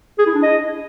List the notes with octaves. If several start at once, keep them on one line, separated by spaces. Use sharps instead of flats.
G#4
E4
D4
D#5